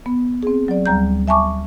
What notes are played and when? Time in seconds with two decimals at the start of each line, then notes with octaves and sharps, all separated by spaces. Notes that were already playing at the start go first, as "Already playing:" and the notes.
0.06 B3
0.43 C4 G#4
0.68 F#3 D5
0.86 D2 G3 A#5 G6
1.28 E5 G#5 A5 C#6 D6